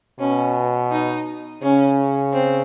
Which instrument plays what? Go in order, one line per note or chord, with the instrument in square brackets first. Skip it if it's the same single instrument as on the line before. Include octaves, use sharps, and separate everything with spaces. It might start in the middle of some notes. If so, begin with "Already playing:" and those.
[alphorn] B2 [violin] C#4
[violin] D#4
[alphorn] C#3 [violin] C#4
[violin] C4